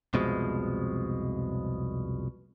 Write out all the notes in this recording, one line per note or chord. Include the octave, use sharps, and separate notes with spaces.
C2 F2 B2 F3 G#3